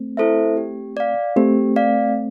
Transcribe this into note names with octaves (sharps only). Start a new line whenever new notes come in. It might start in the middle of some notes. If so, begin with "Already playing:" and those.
Already playing: A3 C4
E4 A4 C5 E5
G4
D5 F5
A3 C4 G4
D5 F5